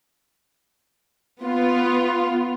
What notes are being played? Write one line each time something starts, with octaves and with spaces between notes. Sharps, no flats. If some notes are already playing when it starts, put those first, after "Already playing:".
B3 F4